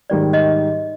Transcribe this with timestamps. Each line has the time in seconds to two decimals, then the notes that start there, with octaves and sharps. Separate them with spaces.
0.10 G#2 D#3 G3 D5
0.33 D#5